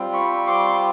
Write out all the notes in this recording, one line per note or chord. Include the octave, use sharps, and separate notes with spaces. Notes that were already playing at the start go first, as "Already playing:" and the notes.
Already playing: G3 C4 F4
B5 C#6
C6 D6